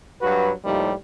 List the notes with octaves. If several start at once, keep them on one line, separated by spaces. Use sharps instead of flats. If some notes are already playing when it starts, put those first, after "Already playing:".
G2 F#3 F#4 B4
D#2 A2 D#3 F3 G3